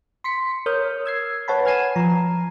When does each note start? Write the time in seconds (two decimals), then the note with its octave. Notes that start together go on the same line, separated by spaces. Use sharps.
0.24 C6 B6 C#7
0.66 A#4 C#5 D#6 F6 G6
1.05 E6 G#6 C7
1.48 B4 C#5 F#5 A5 B5
1.65 G#5 F6 G#6 C7 D#7 E7
1.96 F3 A#5